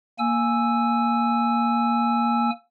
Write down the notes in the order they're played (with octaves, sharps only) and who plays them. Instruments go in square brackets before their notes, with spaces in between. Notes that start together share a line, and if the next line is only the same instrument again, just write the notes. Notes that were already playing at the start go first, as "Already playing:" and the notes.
[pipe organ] A#3 G#5 E6